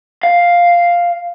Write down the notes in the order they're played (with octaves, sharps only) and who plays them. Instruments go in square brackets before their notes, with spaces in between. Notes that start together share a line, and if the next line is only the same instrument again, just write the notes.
[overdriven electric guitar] F5